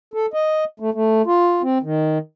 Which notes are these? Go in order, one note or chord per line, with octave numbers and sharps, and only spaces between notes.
A4
D#5
A3
A3
F4
C4
D#3